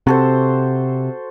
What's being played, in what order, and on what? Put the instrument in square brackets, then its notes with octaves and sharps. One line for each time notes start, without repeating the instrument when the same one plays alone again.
[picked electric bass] C3 [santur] F#4 A4 C5